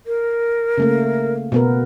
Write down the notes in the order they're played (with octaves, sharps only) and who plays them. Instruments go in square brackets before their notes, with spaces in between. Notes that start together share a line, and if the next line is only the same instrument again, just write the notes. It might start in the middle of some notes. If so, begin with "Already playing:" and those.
[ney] A#4
[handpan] C#3 A3 A#3
B2 B3 A#4